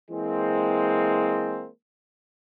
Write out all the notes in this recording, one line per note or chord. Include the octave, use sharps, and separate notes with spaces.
E3 G#3 A#3 C4